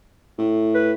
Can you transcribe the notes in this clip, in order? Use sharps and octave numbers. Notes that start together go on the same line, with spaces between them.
A2
B4